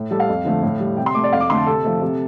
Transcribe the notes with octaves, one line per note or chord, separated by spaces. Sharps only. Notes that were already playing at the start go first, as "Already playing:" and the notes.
Already playing: A2
G3 A4
F5
F2
D3 F3 A3
A2
G3
C3 G5
C6
A3 D6
D5
F2 F5
D6
D3 A3 C6
A5
C3 A4
F3 A3
C3